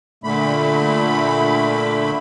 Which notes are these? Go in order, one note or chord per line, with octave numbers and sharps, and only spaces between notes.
A#2 D3 A3 B5